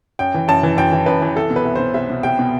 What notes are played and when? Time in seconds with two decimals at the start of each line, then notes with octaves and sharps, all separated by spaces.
0.19 F#2 G5
0.34 E3
0.48 F#2 A5
0.63 E3
0.77 F#2 G5
0.92 E3
1.06 F#2 B4
1.22 E3
1.35 C2 A4
1.50 B2
1.56 B4
1.65 C2
1.75 B2 C5
1.94 C2 E5
2.10 B2
2.23 C2 G5
2.39 B2